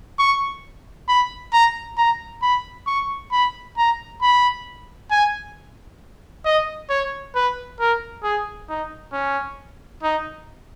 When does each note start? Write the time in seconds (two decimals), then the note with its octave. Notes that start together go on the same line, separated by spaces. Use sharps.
0.19 C#6
1.08 B5
1.53 A#5
1.97 A#5
2.42 B5
2.87 C#6
3.32 B5
3.77 A#5
4.22 B5
5.11 G#5
6.45 D#5
6.89 C#5
7.35 B4
7.80 A#4
8.23 G#4
8.69 D#4
9.13 C#4
10.03 D#4